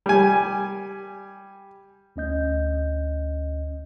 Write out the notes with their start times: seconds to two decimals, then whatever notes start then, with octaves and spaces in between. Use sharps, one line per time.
0.06 G3 G#5
2.16 D2 C#4 D#5 G6